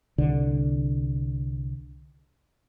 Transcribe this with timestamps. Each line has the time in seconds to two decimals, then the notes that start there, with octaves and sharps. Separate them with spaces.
0.18 C2 D3